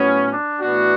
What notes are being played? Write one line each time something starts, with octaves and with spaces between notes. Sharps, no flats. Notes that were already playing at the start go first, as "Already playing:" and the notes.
Already playing: A2 F#3 B3 C#4
D4
A2 E3 B3 D4 F#4